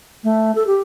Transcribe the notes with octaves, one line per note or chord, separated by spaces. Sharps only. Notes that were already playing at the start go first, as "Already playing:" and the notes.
A3
A4
G4